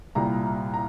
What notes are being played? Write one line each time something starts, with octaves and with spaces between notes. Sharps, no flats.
C2 A#2 G3 A#5
A#5